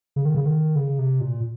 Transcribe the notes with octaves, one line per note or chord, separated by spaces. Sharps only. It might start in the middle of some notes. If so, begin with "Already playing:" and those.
C#3
D#3
C#3
D#3
C#3
C3
A#2